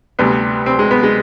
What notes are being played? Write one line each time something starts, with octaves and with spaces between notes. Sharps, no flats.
D2 C3 G3 B3
C4
G#3
B3
G#3